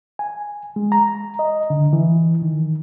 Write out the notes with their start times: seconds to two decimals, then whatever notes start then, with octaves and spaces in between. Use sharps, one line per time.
0.19 G#5
0.76 G#3
0.92 A#5
1.39 D#5
1.70 D3
1.93 E3
2.42 D#3